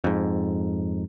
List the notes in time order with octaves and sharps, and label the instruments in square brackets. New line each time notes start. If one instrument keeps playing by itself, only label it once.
[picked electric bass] F2 G#2